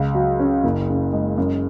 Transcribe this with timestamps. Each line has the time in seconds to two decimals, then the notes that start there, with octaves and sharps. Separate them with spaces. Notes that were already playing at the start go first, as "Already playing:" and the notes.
Already playing: C#2
0.14 F#3
0.39 C#4
0.64 F#1
0.89 C#3
1.13 G#3
1.38 F#2